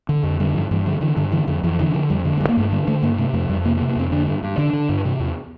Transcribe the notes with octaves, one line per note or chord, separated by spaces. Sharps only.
D3
F2
D3 G3
G2 F3
G2 E3
D3 F3
D3 E3
G2 D3
D3 E3
F2 D3
F2 E3
D3 E3
D3 F3
F2 G3
D3
A#3
G2
A#3
G2 A3
D3 G3
D3 A3
G2 A#3
C3 A3
F2 A3
F2 G3
C3 A#3
A#3
C3
A#3
F2 C4
D3 D4
G2
G2
D3 D4
D3
G2
C3
E2